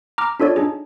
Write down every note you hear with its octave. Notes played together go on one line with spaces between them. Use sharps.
A#5 D6 F6
D4 F4 A4 C#5 D5
D4 D#4 G#4